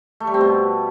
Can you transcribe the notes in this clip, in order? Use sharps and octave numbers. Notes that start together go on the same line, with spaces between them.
A3
G3
C4
B2